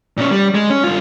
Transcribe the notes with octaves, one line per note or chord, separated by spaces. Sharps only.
A#2 C#4
G3
G#3
C#4
G2 F4